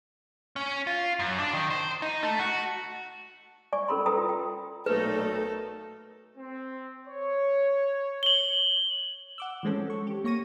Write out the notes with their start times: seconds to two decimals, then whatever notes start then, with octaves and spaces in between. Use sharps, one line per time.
0.56 C#4
0.87 F4
1.19 F#2
1.39 D4
1.53 D#3
1.70 C5
2.02 D#4
2.23 A3
2.40 F#4
3.73 D5 G#5 C#6 D6
3.88 C#4 A4 A#4 B5 C6
4.06 A4 B4 G5 A#5 D#6
4.17 F4
4.29 G5
4.86 B1 A#2 A3 D#4 A4 B4
6.37 C4
7.08 C#5
8.23 F#7 G7
9.38 F#5 D6 E6
9.63 E3 F3 G#3 C4 C#4 A4
9.87 A4 C#6
10.07 G4
10.24 A#3 C#5 C#6 A#6 D#7